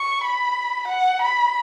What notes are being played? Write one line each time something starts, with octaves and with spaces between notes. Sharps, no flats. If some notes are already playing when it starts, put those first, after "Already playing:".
Already playing: C#6
B5
F#5
B5